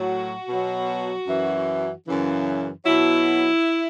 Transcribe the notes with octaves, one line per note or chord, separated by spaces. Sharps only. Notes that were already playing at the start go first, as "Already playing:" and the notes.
Already playing: A2 F#3 F#4
B2 F#3
F#2 E3
F#2 C#3 E3
B2 F#3 E4